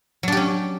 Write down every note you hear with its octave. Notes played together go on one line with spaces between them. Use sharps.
F#3 C#4 D4 G4